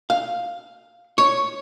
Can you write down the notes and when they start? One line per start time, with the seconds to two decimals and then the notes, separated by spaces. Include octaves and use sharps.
0.10 F5
1.18 C#5